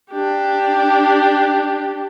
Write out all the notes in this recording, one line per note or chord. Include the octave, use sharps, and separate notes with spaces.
D4 G4